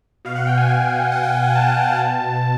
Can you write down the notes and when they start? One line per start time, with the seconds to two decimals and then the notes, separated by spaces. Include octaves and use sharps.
0.25 B2 F5
0.35 F#5
0.47 G5
0.58 G#5
0.68 B2 G5
1.12 B2 F#5
1.23 G5
1.33 G#5
1.44 G#5
1.55 B2 A5
1.98 B2